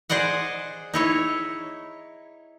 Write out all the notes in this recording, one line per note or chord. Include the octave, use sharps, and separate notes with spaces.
G#4 C5 D5 D#5 F#5
D#4 E4 C#5